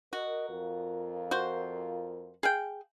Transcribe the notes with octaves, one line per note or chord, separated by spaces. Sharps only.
F#4 A#4 D#5
F2 F4 A#4
F#4 C5
G#4 F5 G5